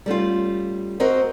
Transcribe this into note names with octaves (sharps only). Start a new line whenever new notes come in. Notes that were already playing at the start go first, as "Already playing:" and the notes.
G3 A3 C#4 F4
C4 F#4 A#4 D#5